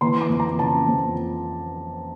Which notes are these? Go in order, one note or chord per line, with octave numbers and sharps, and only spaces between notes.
E3 C6
D6
F2
A#5
C#3 A5
F2